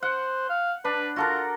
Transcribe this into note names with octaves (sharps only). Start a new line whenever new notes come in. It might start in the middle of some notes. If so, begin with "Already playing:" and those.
C5 F#5
F5
D4 B4
F4 F#4 A4 A#4